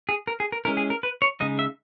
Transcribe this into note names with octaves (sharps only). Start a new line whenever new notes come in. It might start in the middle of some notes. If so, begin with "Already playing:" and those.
G#4
A#4
G#4
A#4
G#3 C#4 E4 A#4
G#4
A#4
B4
C#5
C#3 G#3 D#4 D#5
E5